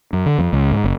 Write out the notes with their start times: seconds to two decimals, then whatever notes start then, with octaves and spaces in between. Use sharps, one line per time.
0.13 F#2
0.26 D3
0.38 F2
0.53 C#2
0.72 G#2
0.84 F#1